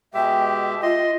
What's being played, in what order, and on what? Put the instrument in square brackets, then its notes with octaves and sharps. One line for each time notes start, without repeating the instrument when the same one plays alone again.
[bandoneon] B2 G#3 G4 [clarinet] E5 [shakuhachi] G5
[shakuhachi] F4 [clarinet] D#5 [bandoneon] C6